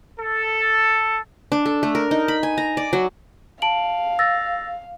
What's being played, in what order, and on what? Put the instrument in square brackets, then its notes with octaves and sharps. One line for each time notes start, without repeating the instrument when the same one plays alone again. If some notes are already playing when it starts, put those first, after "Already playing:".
[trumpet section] A4
[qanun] D4
A4
A3
A#4
D#4
B5
G#5
A#5
D5
F#3
[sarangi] F5 [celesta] A5 D7 F#7
[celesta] E6 A6 A#6